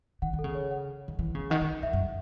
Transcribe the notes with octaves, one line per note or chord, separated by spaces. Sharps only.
D#3 F#5
D#3
A4
C#3
C#5
F#5
D#3
E3
C#3
D#3 F#5
D#3
D#3 E5
F#2